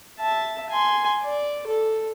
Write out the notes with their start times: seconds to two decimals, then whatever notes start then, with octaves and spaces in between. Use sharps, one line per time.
0.19 E5 A5
0.70 G#5 C6
1.22 D5
1.67 A4